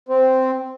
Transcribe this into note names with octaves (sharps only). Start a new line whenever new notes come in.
C4